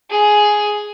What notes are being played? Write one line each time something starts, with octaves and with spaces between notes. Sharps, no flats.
G#4